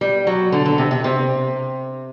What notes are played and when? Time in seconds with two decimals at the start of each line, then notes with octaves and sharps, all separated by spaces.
0.01 G3
0.27 F#3
0.52 D3
0.65 D3
0.78 C3
0.91 C3
1.04 C3